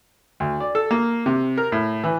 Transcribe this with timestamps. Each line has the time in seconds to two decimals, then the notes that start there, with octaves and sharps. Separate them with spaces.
0.40 D2
0.60 D5
0.75 A4
0.91 A#3
1.26 C3
1.58 A#4
1.72 A2
2.04 E3